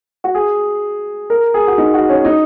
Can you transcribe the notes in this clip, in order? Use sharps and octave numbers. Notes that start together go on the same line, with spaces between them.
F#4
G#4
A#4
G#4
F#4
D#4
F#4
C#4
D#4